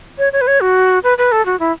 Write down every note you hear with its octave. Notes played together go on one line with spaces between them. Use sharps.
C#5
C#5
B4
C#5
F#4
B4
B4
A4
F#4
E4